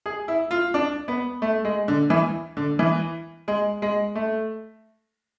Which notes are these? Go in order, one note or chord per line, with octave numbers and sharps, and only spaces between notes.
G#4
E4
F4
D4
B3
A3
G#3
D3
E3
D3
E3
G#3
G#3
A3